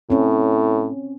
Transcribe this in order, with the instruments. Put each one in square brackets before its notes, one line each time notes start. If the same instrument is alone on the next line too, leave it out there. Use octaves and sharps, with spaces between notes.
[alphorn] A2 [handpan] C4 C#4